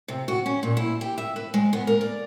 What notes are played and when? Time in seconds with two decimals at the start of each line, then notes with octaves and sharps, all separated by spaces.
0.08 C3
0.28 F#4
0.46 C#4
0.63 A#2
0.77 E4
1.01 G4
1.18 E5
1.36 B4
1.54 G#3
1.73 B3
1.87 A#4
2.01 D5